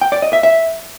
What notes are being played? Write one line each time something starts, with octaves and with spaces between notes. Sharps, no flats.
G5
D5
D#5
E5
E5